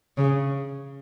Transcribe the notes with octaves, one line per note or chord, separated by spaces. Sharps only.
C#3